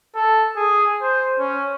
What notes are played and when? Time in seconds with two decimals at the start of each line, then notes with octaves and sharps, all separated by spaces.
0.15 A4
0.56 G#4
1.01 C5
1.39 C#4